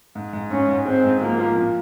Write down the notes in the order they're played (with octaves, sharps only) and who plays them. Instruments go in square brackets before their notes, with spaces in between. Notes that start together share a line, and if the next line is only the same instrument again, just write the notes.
[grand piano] G#2
G#2
[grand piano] G#2 [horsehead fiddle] C#4
[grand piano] G#2
[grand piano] G#3 [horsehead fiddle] C4
[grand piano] G#2
[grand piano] F3 [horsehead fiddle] A#3
[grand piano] F3
A#2